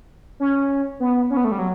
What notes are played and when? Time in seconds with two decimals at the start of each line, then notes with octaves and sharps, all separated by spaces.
0.40 C#4
1.00 B3
1.30 C#4
1.37 B3
1.45 A3
1.52 G3
1.59 F#3